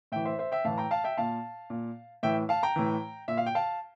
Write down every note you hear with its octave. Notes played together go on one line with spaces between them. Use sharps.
A2 E3 E5 G5
C5 E5
C5 E5
E5 G5
A2 E3 F5 A5
G5 A#5
F5 A5
E5 G5
A#2 F5 A5
A#2
A2 E3 E5 G5
F5 A5
G5 A#5
A2 E3
A#2 E5
F5
G5
F5 A5